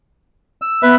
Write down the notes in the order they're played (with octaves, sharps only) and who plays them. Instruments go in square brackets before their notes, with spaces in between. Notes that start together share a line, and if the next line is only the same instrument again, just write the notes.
[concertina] E6
[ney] B3 [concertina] B4 E5